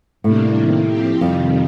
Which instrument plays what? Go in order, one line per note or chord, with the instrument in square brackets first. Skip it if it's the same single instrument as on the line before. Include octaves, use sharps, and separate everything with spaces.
[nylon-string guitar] A2 [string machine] C3 G3 A#3 D4
[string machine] C3 D#3 A#3
F3 C4 G4
[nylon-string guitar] F2 [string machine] C3 D#3 G3